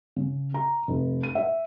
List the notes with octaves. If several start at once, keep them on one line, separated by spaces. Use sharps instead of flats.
C#3
A#5
F1
D#7
E5